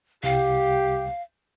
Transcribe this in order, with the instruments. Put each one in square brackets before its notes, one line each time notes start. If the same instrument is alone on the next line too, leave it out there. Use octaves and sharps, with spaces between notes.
[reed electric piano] C2 [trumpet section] G4 [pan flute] F5